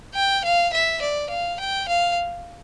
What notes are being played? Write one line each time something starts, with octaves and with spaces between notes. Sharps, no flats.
G5
F5
E5
D5
F5
G5
F5